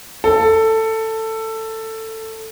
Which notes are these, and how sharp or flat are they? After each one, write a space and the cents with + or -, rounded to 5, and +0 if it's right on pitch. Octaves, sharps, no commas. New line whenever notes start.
A4 +15